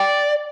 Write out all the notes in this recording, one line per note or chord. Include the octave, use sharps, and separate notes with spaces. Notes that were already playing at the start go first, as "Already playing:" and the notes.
Already playing: D5 G5